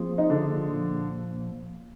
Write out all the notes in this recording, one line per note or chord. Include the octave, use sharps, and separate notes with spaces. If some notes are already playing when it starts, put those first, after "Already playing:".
Already playing: F3 A#3 C4 F4 G#4
D#4
D3 D4
A#2 F3 A#3